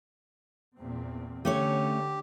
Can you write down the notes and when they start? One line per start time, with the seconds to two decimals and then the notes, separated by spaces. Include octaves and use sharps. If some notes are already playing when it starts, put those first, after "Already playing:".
0.77 E2 A#2 C4
1.45 D3 A3 C#4 G4 C#5